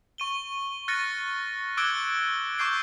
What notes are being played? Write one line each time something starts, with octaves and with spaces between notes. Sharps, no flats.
C#6 D#7 G7
F6 F#6 A6 A#6 C#7 D#7
D6 E6 F#6 G#6 D7 G7
C#6 D6 G6 C7 D7 G7